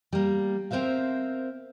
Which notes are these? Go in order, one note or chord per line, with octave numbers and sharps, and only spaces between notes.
G3 A#3
C4 A#4 C5 E5 F5